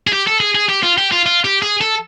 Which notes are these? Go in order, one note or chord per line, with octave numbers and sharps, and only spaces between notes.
G#4
G4
A4
G#4
G#4
G4
F4
G4
F4
F4
G4
G#4
A4